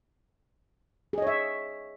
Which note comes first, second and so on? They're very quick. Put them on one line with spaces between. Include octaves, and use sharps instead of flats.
G#4 D#5 C#5 E5